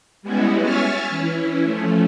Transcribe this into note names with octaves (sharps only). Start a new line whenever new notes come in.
G3 G#3 B3 C#4 E4 F#4
C#5 E5 G#5 C#6 F6 A6
E3 C#4 E4
F3 A3 C#4